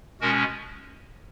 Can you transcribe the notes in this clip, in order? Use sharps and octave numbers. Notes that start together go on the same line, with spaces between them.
B2 G#3 C#4 F#4 A#4